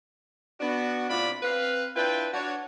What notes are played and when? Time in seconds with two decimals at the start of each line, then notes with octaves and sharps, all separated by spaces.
0.61 B3 D4 F#4
1.10 A2 C3 D4 F4 D5 B5
1.43 C4 B4 F5
1.96 D4 E4 F4 B4 G5
2.33 D4 F#4 C#5